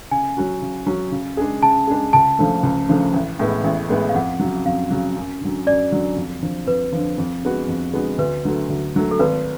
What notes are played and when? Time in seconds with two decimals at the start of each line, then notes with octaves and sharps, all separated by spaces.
0.11 C#3 G#5
0.37 F#3 C#4 F#4
0.61 C#3
0.86 F#3 C#4 F#4
1.12 C#3
1.37 G#3 D4 G#4
1.62 C#3 A5
1.87 G#3 D4 G#4
2.13 C#2 A5
2.39 C#3 F3 A3 D4
2.63 C#2
2.89 C#3 F3 A3 D4
3.14 A1
3.39 A2 G#3 B3
3.64 A1
3.89 A2 G#3 B3
4.09 F5
4.15 F2 F#5
4.40 C#3 F#3
4.65 F2 F5
4.91 C#3 F#3
5.16 F#2
5.41 D3 F#3
5.67 F#2 D5
5.91 D3 F#3
6.16 F2
6.41 D3 F3
6.67 F2 B4
6.93 D3 F3
7.18 F2
7.43 D3 G#3 B3 F#4
7.68 F2
7.93 D3 G#3 B3 F#4
8.18 D2 B4
8.45 D3 F#3 A3
8.69 D2
8.94 D3 F#3 A3
9.11 A4
9.19 G#1 B4